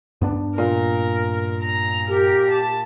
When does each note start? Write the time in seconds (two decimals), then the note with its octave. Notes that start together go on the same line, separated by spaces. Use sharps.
0.21 G2 B3 D4
0.58 A#2 A#4
1.62 A#5
2.08 G4 A#4
2.51 A5